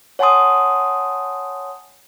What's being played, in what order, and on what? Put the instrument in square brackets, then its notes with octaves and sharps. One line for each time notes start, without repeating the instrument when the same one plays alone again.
[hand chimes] C#5 F#5 G#5 A5 C6 D#6